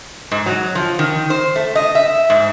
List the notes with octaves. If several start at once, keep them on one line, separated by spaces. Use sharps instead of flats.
G#2
F#3
F3
D#3
C5
A3
D#5
E5
G#2